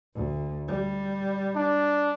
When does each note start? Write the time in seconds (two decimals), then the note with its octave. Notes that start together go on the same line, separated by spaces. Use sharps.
0.15 D2
0.68 G3
1.56 D4